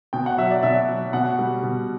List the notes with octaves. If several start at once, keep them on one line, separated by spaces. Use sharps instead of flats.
B2 G5
F#5
F#3 E5
D5
B2 E5
F#3
B2 F#5
G3
B2